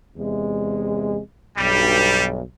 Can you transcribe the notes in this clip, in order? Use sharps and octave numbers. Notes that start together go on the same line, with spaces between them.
E2 C3 G#3
B1 G2 G3